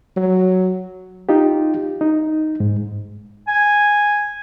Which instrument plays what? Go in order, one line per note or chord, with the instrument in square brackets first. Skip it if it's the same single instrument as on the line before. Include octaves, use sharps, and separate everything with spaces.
[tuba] F#3
[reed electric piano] D#4 F4 G4
D#4
G#2
[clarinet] G#5